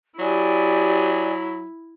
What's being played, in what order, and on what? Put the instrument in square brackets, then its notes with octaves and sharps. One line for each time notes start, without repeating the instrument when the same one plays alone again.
[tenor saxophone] F#3 [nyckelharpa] E4 [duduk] G4 [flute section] D5 G#5 D#6